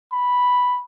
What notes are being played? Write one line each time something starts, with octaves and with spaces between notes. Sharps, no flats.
B5